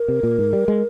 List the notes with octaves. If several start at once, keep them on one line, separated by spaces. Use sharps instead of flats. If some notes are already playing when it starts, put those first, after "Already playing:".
Already playing: A#4
C3
A#2
G#2
G3
G#3